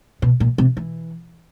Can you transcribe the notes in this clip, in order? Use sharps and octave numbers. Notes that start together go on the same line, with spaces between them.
B2
A#2
C3
E3